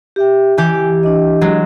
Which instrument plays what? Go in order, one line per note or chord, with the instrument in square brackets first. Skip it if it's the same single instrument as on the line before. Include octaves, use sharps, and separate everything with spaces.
[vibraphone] G4 E5 G5
[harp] E3 G4 [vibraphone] G#5
[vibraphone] D4 D#5
[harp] F#3 G#3